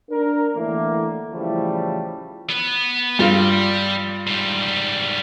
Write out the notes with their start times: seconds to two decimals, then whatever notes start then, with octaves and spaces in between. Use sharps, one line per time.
0.10 D4 A#4
0.55 A2 D3 E3 A3 A#3
1.33 A2 C#3 E3 F3 G3 A3
2.50 B3 B4
3.19 G2 G3 F4
4.27 G#2 G3